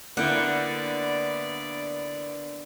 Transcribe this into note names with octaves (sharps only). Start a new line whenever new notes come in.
D3 A#3 B3 E4 D5 F#5 G5